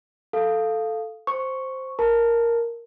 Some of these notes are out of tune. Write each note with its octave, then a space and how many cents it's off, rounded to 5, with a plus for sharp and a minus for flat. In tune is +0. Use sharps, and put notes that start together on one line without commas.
A4 +0 F5 -5
C5 +0 C#6 +0
A#4 +0 A5 +0